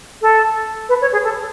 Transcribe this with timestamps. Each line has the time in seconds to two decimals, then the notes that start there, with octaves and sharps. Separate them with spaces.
0.22 A4
0.89 B4
1.01 C#5
1.12 G#4
1.24 A4